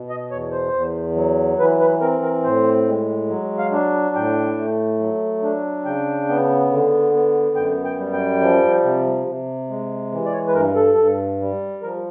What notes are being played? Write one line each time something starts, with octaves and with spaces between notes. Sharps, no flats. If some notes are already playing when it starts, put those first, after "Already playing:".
Already playing: B2
D#5
E2 C#5
C5
E2
F#3
E3 B4
B4
C4 A#4
A#4
A2 C5
G#3
F#3
F5
D4
A2 G5
A3
F#3
D4
C#3 G5
B3
D3
B3
F#2 G5
G5
G3
G5
F3
C3
C3
G#3
E3
D5
C#5
B4
G2 A#4
A4
G2
G3
F3 A#4